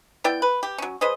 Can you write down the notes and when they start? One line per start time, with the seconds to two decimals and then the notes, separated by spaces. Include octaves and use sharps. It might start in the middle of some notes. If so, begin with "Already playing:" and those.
0.24 B3 E4 D5 G5
0.42 B4
0.63 G4
0.78 F#3 C#4
1.01 G#3 B4 C5 D#5